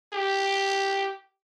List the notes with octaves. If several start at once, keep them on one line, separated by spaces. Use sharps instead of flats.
G4